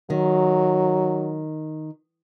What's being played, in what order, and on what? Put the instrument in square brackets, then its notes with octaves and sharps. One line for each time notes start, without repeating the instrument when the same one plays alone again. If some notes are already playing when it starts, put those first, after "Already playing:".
[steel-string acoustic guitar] D#3 [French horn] F#3